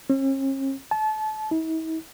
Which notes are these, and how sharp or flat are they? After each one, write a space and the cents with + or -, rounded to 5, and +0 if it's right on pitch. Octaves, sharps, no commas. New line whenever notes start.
C#4 -45
A5 -30
E4 -45